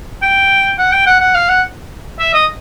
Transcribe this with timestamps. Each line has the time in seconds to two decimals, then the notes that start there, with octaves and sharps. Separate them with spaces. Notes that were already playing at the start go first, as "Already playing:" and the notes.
0.22 G5
0.78 F#5
0.92 G5
1.07 F#5
1.20 F#5
1.35 F5
1.49 F#5
2.19 E5
2.33 D#5